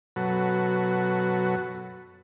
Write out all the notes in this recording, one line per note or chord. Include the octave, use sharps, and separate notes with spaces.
F#2 B2 F#3 F#4 A4 B4